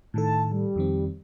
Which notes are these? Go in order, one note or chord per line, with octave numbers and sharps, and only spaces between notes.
A2 D#3 A4 A5
G3
F2 D#3 C4